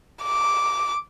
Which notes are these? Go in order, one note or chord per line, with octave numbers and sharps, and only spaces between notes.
D6